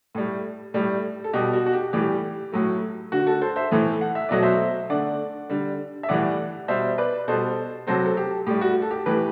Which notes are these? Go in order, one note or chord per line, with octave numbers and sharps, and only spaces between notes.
A2 G3
A2 G3
A4
B2 G3 G4
F#4
F#4
G4
A2 E3 G3 G4
A2 F#3 A3
D3 A3 F#4
F#4 A4
A4 C5
C5 E5
A2 E3 A3
F#5
E5
B2 F#3 A3 D5
C5 E5
D3 A3 D5 F#5
D3 G3
E5
A2 E3 G3 D5 F#5
B2 G3 C5 E5
B4 D5
B2 G3 A4 C5
C3 F#3 A3 A4 C5
A4
G4
A2 G3 G4
F#4
A4
G4
A2 E3 A3 G4 B4